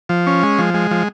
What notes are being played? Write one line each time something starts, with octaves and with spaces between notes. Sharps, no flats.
F3
C#4
G#3
F3
G#3
F3